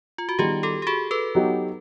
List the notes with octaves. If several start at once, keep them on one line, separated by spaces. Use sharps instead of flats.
F4
F#4
D#3 G3 B3 D#4 F4 G4 G#4
G4 A4
G4
F#4 G#4
A4 B4
F#3 B3 D#4 G4